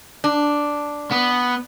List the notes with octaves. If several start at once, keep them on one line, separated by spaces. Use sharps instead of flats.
D4
B3